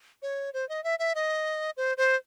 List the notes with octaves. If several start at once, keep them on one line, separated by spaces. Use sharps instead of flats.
C#5
C5
D#5
E5
E5
D#5
C5
C5